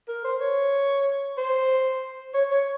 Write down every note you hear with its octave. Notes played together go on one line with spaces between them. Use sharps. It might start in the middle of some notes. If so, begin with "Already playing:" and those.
A#4
C5
C#5
C5
C#5
C#5